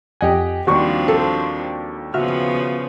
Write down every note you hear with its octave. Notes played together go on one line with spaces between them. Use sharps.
F2 G4 D#5 F#5 G#5
D#2 F3 G3 C4 D4 F#4 C#6
A4
C#3 F3 B3 F#4 E5 F6